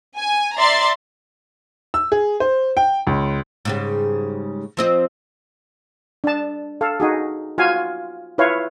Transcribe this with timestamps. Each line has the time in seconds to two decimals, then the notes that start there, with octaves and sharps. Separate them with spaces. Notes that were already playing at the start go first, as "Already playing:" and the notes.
0.18 G#5
0.57 D5 E5 A#5 C6 A6 C7
1.94 E6
2.12 G#4
2.40 C5
2.77 G5
3.07 C#2
3.65 G#2 C#3 G3
4.77 F3 C4 D#5
6.24 D4 A5
6.81 A4 F5
7.00 D#4 F#4 G#4
7.58 F4 F#4 F5 G#5
8.38 E4 F4 B4 C#5 F5